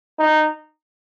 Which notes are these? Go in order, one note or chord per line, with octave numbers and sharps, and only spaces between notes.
D#4